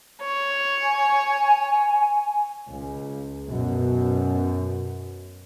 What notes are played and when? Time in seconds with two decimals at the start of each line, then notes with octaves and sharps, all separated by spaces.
0.21 C#5
0.82 G#5
2.69 C#2
3.46 F#2 B2